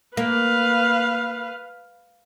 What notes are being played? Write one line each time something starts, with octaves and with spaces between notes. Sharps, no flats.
A#3 B4 F5